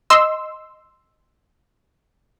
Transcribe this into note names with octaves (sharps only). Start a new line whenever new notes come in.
D#5 C6 E6